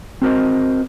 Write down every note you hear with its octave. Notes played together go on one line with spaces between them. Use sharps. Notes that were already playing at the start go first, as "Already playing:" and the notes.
C4 F#4 A#4 C5 D#5